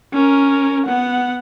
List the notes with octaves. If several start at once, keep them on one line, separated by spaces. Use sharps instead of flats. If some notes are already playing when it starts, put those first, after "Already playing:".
C#4 A#4
B3 F#5